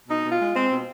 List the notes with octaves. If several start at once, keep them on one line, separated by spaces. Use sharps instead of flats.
B2 D#4
B2
F4
G#3
G#3 C4
B2